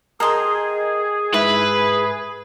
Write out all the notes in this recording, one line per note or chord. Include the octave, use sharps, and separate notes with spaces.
G#4 A#4 D#5 G5 A#5 C6
G#2 E4 B4